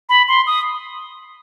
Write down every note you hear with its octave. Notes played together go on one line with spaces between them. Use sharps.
B5
C6
D#6